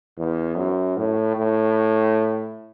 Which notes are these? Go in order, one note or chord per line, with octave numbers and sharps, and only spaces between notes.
E2
F#2
A2
A2